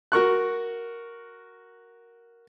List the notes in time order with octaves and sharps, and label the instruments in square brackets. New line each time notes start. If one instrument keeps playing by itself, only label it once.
[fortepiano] F#4 A#4 C#6 F#6